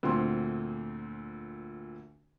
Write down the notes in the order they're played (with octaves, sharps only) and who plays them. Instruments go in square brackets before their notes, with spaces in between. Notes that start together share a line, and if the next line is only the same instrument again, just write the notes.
[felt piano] D2 A#2 D3 C4 C6